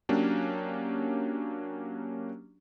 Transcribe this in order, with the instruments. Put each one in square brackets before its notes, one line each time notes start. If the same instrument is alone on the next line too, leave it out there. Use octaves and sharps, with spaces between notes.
[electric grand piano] F#3 A#3 C#4 D4 G4